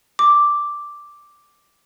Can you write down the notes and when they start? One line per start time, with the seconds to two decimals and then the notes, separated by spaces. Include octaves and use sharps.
0.19 D6